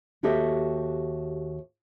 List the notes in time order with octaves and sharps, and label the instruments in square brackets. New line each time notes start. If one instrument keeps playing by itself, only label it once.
[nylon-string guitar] D#2 F#4 G4 A4 D#5 E5